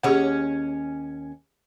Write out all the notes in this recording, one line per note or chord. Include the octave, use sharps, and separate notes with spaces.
D#2 C#4 G4 G#4 F#5